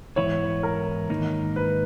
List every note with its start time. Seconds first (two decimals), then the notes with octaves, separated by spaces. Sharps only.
0.16 G#2 E3 B3 E4 C#5
0.63 A#4
1.10 G#2 D#3 A#3 D#4
1.56 B4